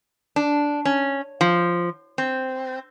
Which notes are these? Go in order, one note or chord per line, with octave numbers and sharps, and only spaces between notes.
D4
C#4
F3
C4